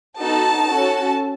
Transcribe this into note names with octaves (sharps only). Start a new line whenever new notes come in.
B3 D#4 F#4 A4 A5
C#4 F#4 A4